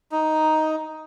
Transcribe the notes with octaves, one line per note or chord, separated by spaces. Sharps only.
D#4